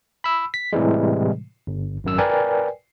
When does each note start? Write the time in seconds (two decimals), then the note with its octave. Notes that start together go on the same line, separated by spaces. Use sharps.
0.24 B5 E6
0.54 B6
0.73 A2 C3 E3 G3 G#3
1.67 G1
2.04 G#1 F#2 E6
2.18 A#4 B4 D5 G5 G#5